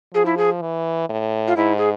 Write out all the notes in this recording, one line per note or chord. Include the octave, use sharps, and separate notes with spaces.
F3 G#4
E4
G#4
E3
A2
F4
G#2 E4
G#4